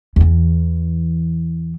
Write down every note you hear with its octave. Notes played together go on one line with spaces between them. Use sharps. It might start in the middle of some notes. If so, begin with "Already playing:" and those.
E2 E3